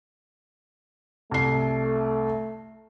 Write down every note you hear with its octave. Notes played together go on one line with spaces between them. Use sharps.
C2 A3 C7